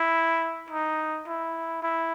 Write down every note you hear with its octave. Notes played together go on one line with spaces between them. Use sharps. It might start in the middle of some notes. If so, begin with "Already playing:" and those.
Already playing: E4
D#4
E4
E4